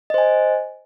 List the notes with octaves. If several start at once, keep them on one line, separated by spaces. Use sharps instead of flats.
C5 D#5 G#5